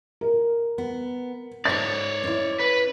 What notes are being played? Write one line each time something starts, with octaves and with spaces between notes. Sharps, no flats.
A#4
B3
G#2 D#4 C#5 D5 A6
C#4 E4
B4